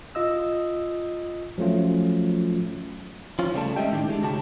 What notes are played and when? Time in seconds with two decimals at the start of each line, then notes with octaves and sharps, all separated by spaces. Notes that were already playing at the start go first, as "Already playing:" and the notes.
0.15 F4 D#5 E6
1.58 F3 F#3 A3 C#4 F4
3.39 F3 C#4 F4
3.54 C#3 G3 A3 A5
3.76 G#3 A3 C#4 D#5 E5 G5
3.92 A2 D#3 D4 G4
4.10 G#3 D4
4.23 C#3 F#4 G4 A5